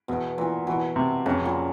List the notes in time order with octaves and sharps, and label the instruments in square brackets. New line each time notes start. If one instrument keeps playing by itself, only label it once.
[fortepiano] E2 [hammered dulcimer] B2
[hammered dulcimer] A#2 [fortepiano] E3
[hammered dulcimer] B2 [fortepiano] E3
[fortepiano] C3
[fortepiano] F2 [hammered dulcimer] C#3
[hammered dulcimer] A#2